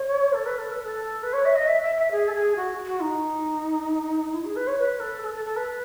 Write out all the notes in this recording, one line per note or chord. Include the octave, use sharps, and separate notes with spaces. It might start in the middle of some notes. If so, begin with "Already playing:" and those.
Already playing: C#5
A4
B4
A4
B4
A4
B4
C#5
E5
D#5
E5
E5
E5
G#4
A4
G#4
F#4
F#4
D#4
E4
G#4
B4
C#5
B4
A4
A4
A4
A4
B4